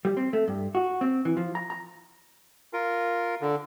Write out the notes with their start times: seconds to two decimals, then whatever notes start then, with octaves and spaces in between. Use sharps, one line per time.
0.05 G3
0.17 C4
0.33 A3
0.48 G2
0.75 F#4
1.01 C4
1.25 E3
1.37 F3
1.55 A#5
1.70 A#5
2.73 F4 A#4
3.41 D3